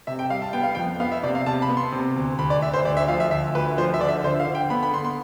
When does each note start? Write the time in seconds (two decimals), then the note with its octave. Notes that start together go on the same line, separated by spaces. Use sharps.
0.07 C3 E5
0.19 G5
0.30 G3 F5
0.42 A5
0.53 B3 G5
0.63 F5
0.75 F2 G5
1.00 B3 F5
1.12 E5
1.23 C3 D5
1.35 F5
1.46 C3 A5
1.62 B5
1.69 B3
1.77 C6
1.92 C3
2.16 D2
2.39 D2 B5
2.50 D5
2.62 D2 E5
2.74 C5
2.85 D2 D5
2.97 E5
3.08 F3 F5
3.20 E5
3.31 D2 E5
3.55 D2 B4
3.77 F3 C5
3.94 E5
4.01 D3 D5
4.08 E5
4.24 D3 C5
4.40 F5
4.47 D3
4.55 G5
4.70 B3 B5
4.83 B5
4.93 D3 C6
5.05 C6